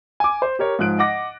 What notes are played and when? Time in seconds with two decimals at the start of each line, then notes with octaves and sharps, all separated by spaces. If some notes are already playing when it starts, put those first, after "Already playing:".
0.20 G#5 D6
0.42 C5
0.59 G4 A#4 C#5
0.79 G#2 F3 F#6 D7
0.98 D#5 F#5 D6 A#6